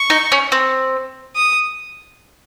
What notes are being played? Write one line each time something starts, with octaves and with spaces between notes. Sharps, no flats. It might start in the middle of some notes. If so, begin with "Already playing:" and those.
Already playing: C#6
D#4
C#4
C4
D#6